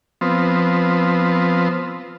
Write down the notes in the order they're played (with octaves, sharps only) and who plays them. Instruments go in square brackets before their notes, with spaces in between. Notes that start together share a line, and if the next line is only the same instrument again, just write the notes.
[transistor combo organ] F3 B3 C4